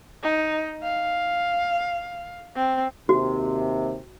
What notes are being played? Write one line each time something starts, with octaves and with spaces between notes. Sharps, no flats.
D#4
F5
C4
D#2 C3 F#4